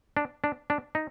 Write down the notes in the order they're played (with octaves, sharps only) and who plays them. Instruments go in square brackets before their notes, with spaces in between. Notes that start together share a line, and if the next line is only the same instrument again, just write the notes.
[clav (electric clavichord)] D4
D4
D4
D#4